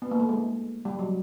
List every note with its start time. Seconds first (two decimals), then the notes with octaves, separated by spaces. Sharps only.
0.02 B3
0.11 A#3
0.20 A3
0.29 G#3
0.85 G3
0.99 F#3